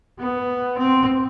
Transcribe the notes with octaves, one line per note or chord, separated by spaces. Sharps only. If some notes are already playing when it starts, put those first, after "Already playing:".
B3
C4